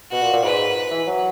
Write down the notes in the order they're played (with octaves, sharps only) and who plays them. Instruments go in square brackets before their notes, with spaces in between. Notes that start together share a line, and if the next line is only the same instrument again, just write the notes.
[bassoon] B2 [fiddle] F#4
[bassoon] A#2
A#2
[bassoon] G#2 [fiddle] B4
[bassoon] E3
F#3